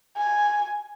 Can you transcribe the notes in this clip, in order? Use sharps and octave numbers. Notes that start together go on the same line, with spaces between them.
G#5